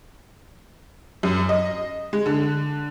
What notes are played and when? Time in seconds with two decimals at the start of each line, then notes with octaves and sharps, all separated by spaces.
1.23 F#2
1.49 D#5
2.13 G#3
2.26 D3